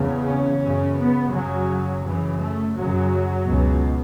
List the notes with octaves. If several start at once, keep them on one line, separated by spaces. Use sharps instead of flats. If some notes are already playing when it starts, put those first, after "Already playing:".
Already playing: E2 C#3
C#4
F#2 C#3
B3
F#2 C#3 F#3
F#2 C#3 E3
A3
F#2 C#3 F#3
C#2 B2